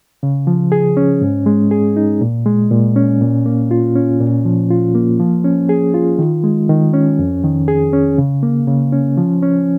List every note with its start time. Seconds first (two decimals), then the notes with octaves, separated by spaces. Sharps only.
0.23 C#3
0.47 F3
0.72 G#4
0.97 C#4
1.21 G#2
1.46 G#3
1.71 G#4
1.96 D#4
2.21 A#2
2.46 G#3
2.71 A#2
2.96 C#4
3.21 A#2
3.46 A#3
3.71 F4
3.95 C#4
4.21 A#2
4.45 F3
4.70 F4
4.95 A#3
5.20 F3
5.44 C#4
5.69 G#4
5.94 F4
6.19 D#3
6.44 G#3
6.69 D#3
6.94 C#4
7.19 F2
7.43 D#3
7.68 G#4
7.93 C#4
8.18 C#3
8.43 A#3
8.67 C#3
8.93 C#4
9.17 F3
9.42 C#4